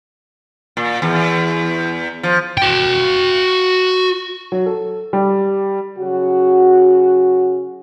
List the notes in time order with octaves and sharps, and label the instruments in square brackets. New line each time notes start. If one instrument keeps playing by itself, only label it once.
[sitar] A#2
E2
F3
[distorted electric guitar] F#4 G5
[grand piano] F#3
A4
G3
[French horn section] C#3 F#3 F#4